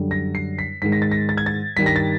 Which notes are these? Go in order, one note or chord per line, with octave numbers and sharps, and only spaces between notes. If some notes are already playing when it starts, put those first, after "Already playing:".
Already playing: F#2 D3 G3
A#6
C7
B6
G#2 D#3 G#3 B6
A#6
A6
A#6
A6
G#6
A6
G2 D#3 G3 B6
A#6
A6